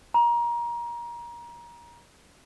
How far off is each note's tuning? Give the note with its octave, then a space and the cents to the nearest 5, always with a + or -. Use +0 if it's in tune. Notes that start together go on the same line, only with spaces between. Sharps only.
A#5 +25